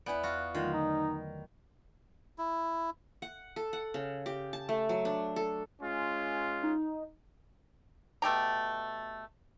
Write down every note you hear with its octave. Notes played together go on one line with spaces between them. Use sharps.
E2 B3 E4 D5
F4 F#4
D#6
D3 D#3 F#3 A3 F4
D#4
E4
F#5
A4
F#5
C#3
G4
A5
A3
F#3
D4
A4
G#3 C#4 F4
D#4
B2 A3 G4 A#5